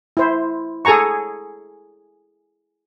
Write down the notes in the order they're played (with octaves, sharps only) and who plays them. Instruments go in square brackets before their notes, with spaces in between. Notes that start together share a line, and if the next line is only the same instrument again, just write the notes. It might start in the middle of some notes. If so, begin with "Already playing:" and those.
[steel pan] E4 C5
G#4 A4 G#5 A#5 C#6